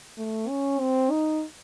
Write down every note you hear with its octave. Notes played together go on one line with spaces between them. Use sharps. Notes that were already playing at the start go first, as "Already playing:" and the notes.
A3
C#4
C4
D#4